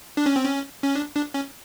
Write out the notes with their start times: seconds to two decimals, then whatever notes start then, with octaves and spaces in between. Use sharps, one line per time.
0.17 D4
0.26 C#4
0.36 C4
0.44 C#4
0.84 C#4
0.95 D4
1.15 D4
1.34 C#4